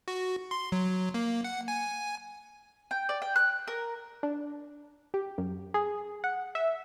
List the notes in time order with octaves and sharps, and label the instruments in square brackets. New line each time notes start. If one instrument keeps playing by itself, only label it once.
[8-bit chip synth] F#4
C6
F#3
A#3
F#5
G#5
[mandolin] G5
D5
G5
F#6
A#4
[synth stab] D4
G4
F#2
G#4
F#5
E5